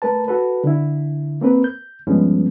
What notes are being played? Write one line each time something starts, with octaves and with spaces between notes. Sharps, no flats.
A3 A#4 B4 A5
F#4 A4 B4
D3 E4
A#3 C4 A#4 B4
G6
G2 F3 G3 G#3 B3 C#4